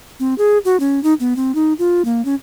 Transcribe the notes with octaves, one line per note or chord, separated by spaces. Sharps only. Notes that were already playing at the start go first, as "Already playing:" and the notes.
C4
G#4
F#4
C#4
D#4
B3
C4
D#4
F4
A#3
C#4